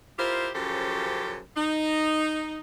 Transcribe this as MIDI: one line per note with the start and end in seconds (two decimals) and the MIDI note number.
0.19 0.50 64
0.19 0.50 65
0.19 0.50 67
0.19 0.50 70
0.19 0.50 72
0.54 1.37 42
0.54 1.37 49
0.54 1.37 53
0.54 1.37 67
0.54 1.37 69
0.54 1.37 72
1.57 2.60 63